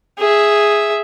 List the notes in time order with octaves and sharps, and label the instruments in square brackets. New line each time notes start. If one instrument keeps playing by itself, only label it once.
[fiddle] G#4 E5